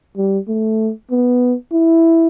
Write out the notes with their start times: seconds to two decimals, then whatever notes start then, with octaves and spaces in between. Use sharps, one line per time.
0.17 G3
0.48 A3
1.11 B3
1.73 E4